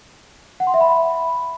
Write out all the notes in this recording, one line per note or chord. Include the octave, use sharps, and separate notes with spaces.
F#5
C6
E5
B5